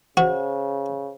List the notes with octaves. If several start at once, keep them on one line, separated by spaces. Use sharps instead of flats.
C#3 F#4 C5